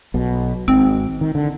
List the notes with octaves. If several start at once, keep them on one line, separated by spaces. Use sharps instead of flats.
B1 B2
G#1 G#2 C4
D#3
D3